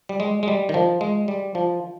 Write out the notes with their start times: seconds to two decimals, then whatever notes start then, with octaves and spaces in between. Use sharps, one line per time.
0.09 G3
0.20 G#3
0.43 G#3
0.48 G3
0.69 D#3
0.74 F3
1.01 G#3
1.28 G3
1.55 F3